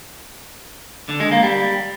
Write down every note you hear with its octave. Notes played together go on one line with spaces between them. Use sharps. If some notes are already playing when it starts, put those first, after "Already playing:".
D3
G#3
A#3
G3